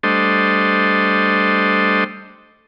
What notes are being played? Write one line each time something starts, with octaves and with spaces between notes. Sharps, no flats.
G3 A3 D4 A4 C5 D#5